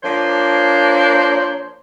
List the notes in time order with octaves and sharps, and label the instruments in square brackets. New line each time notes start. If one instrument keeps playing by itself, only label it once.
[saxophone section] F3 A#3 D4 C5 C#5